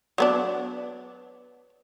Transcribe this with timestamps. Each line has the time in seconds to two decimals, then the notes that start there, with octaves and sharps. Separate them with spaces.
0.18 F#3 B3 D4